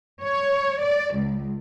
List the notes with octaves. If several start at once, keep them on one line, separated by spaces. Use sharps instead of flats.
C#5
D5
C#2